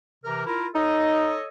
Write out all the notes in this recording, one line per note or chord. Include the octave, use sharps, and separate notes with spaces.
C3 E3 A#4
E4 F4 A#4
D#4 A4 C#5 D#5